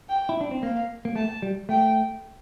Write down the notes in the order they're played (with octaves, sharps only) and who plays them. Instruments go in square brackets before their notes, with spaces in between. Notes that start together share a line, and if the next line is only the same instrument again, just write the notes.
[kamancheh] G5
[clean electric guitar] E4
D4
C4
[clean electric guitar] A#3 [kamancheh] F5
[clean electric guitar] A#3
[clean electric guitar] A3 [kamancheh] A5
[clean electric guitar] G3
[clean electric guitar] A3 [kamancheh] G5